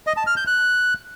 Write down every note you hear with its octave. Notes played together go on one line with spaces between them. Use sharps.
D#5
A5
F6
G6
F#6